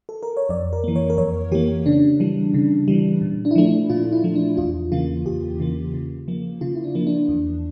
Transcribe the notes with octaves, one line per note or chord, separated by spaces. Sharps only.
A4
A#4
C#5
F2 D5
A#4
E3 A#3
C#5
A#4
F2 C#5
E3 A#3 G4
C#3 D4
E3 G3
C#3
E3 G3
A#2
D4
E4
F3 A3 D4
D4
A#2 F4
E4
F3 A3
D4
E2 F4
C#3 E3 A#3 F4
E2 G4
C#3 E3 A#3
C#3
F3 A#3
C#3 F4
E4
D4
F3 A#3
D4
E2